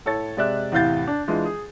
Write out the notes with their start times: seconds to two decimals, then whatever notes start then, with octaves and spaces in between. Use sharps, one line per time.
0.06 A2 A4 C#5 A6
0.37 C3 G#3 D5 E5 F#6
0.72 E2 A2 C3 F5 G6 A6
1.07 D4
1.28 E3 G#3 D4 F4
1.45 G#4